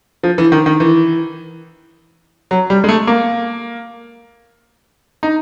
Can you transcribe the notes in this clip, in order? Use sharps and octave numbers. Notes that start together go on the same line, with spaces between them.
F3
E3
D#3
D#3
E3
F#3
G3
G#3
A3
A#3
D#4